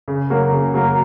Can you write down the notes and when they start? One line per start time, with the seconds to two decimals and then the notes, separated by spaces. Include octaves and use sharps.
0.08 C#3
0.30 F#3 A#3 F#4 A#4
0.52 C#3
0.74 F#3 A#3 F#4 A#4